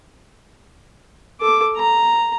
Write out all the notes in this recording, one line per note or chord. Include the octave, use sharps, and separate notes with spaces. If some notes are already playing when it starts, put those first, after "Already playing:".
A4 D6
A#5